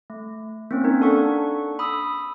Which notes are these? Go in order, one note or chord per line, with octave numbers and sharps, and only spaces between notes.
A3
A#3 C4 C#4
A#3 D#4 A#4
D4 A4 F#5 C#6
B5 D#6 E6